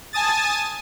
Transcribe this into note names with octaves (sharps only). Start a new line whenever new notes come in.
G#5 A5 D#6 A6